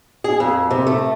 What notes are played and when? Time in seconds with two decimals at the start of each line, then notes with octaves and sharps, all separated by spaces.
0.24 G#4
0.40 F2
0.71 C3
0.87 A3